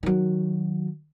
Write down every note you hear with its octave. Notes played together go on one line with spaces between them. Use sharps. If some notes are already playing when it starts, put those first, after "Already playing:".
D#3 F#3